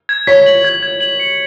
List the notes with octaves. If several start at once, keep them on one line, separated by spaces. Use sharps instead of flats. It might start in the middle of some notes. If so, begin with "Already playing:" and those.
G#6
C#5 B6
F#7
G#6
G#6
F#7
C#7